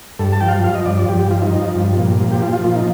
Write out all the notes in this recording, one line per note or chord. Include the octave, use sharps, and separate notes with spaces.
G2 A4
A5
F3 G5
F5
F3 F5
D#5
G2 D5
D5
G2 G4
G4
F3 F4
D#4
F3
G2
A#2
F3
G4
F3 F4
F4
A#2 F4
D#4